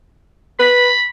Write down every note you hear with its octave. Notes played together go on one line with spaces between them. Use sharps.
B4 B5